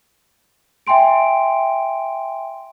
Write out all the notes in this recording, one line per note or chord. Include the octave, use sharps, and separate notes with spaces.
E5 G5 G#5 C6 D7